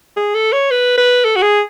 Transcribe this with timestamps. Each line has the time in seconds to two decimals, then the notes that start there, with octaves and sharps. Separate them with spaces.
0.17 G#4
0.34 A4
0.52 C#5
0.71 B4
0.97 B4
1.24 A4
1.36 F#4
1.42 G#4